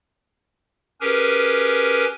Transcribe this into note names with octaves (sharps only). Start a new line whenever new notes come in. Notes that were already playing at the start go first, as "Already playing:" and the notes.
C#4 G4 G#4 A#4 B4 G#5